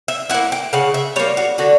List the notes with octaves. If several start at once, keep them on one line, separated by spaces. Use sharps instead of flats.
E5
A#3 E4 F#5
G5
C#3 F#5
E5
G3 A#3 C#5
F#4
D3 F#4